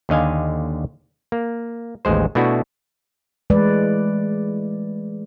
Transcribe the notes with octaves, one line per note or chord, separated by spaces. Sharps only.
D#2 D3 D#5 F5 G#5
A#3
A1 D#2 G#3 C5
B2 A3 D4 E4 F#4
E3 G#3 A3 B4 D5